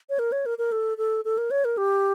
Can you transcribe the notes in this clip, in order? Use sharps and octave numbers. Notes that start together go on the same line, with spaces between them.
C#5
A#4
C#5
A#4
A#4
A4
A4
A4
A#4
C#5
A#4
G4